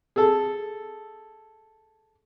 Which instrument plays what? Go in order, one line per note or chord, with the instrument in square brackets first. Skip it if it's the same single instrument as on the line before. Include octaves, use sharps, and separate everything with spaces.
[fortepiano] G#4 A4